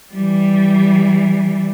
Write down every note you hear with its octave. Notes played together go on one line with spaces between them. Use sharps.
E3 G3